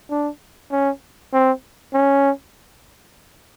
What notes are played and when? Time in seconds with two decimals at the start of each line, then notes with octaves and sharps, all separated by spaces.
0.10 D4
0.72 C#4
1.33 C4
1.94 C#4